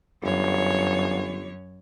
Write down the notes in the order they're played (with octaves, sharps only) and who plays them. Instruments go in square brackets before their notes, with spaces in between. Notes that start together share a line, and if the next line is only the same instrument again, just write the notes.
[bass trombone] G1 [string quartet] F#2 C#5